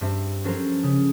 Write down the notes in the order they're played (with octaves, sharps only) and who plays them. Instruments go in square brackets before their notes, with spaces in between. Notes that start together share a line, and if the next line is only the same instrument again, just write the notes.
[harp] G2 C4 E5
F3 F#3 C#4 A4 A#4 C5
C#3